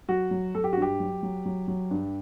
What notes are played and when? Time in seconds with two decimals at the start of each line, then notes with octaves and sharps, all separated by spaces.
0.09 F#3 F#4
0.31 F#3
0.55 F#3 A4
0.64 G4
0.73 F#4
0.77 G2 G4
1.00 F#3
1.23 F#3
1.46 F#3
1.68 F#3
1.91 G2